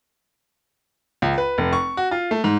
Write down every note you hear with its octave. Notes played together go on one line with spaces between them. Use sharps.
C#2
B4
F1
C#6
F#4
F4
A3
G#2